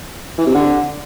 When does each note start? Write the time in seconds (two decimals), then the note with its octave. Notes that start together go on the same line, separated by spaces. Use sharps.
0.38 E3
0.46 C3
0.55 D3